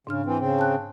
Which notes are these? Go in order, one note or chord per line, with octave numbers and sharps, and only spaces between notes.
G#2 C#3 D4 F6
E3 C4
C#3 C4
A5 F#6